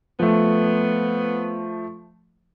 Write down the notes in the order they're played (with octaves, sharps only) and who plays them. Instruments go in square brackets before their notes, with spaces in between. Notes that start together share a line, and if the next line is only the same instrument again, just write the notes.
[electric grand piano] F3 A3 [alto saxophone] B3